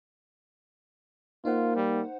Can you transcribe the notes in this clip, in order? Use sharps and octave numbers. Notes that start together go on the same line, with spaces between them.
A#3 D#4 F4 C5 F#5
G3